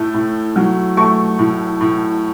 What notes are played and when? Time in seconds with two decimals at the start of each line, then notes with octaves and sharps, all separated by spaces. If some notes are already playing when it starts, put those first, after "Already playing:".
Already playing: A2 A3
0.14 A2
0.56 F#3
0.97 A3 C#6
1.39 A2
1.81 A2